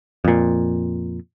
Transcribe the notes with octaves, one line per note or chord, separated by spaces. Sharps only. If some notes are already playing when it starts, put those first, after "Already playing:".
F2 A#2